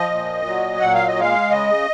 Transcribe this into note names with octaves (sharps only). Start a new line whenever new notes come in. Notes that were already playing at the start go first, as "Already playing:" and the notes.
Already playing: F3 D#5
A#2
F#3
A#2 F#5
F5
D#5
G#3 F5
C#3 D#5